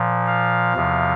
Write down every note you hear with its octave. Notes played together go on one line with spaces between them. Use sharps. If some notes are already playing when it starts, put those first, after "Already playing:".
Already playing: A#2 F3
F5
E2 C3 F3